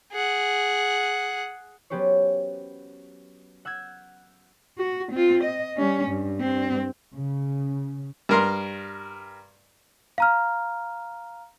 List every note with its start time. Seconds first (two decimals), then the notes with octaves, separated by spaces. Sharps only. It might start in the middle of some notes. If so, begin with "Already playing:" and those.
0.12 G#4 F#5
1.90 F#3 B3 C#4 G4 C5 C#5
3.65 F#5 E6 G6 G#6
4.78 F#4
5.12 C4 F4
5.44 D#5
5.77 G3 C#4
6.08 G2
6.41 G2 C4
7.14 C#3
8.29 G2 A#4 C6
10.18 F5 A#5 F6